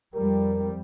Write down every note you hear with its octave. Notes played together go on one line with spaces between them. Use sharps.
F2 G3 A#4